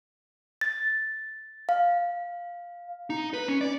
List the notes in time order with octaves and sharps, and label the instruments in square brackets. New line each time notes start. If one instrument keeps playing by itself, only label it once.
[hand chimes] A6
F5
[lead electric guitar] D#4
B4
C#4
D5